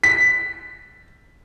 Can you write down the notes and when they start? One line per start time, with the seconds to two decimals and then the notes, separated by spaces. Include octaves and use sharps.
0.04 B6